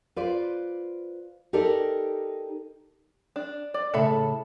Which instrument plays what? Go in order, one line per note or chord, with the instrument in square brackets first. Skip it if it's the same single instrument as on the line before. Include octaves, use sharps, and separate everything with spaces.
[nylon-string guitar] F4 B4 C5 D5
D#4 G4 A4 A#4 D5
[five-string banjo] D4
D5
[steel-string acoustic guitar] A2 C#3 A5 [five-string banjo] A4 E5 B5